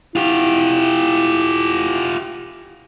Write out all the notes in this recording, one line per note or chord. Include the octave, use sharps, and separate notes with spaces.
E4 F4 G4